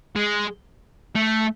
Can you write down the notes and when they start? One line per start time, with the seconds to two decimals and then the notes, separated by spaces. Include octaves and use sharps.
0.16 G#3
1.15 A3